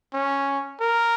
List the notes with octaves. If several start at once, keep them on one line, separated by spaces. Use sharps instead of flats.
C#4
A#4